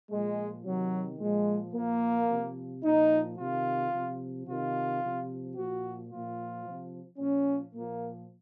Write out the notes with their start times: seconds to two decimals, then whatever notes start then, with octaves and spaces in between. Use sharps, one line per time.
0.11 A#2 F3 G#3
0.65 C3 D#3 F#3
1.19 A#2 F3 G#3
1.74 A#2 F3 A#3
2.29 C3 F3
2.84 A#2 F3 D#4
3.38 C3 D#3 F4
3.92 C3 F3
4.47 C3 D#3 F4
5.02 C3 F3
5.56 A#2 F3 F#4
6.10 A#2 F3 F4
6.65 C3 F3
7.18 A#2 F3 C#4
7.73 A#2 F3 A#3